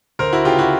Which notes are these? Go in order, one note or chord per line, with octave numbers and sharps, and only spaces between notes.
D2 A#4 C5
E4 F#4
C#3 F4 G4
E4 F#4